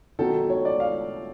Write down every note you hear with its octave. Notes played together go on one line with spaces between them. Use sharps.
D#3 F#3 B3 A4
C#5
D5
F5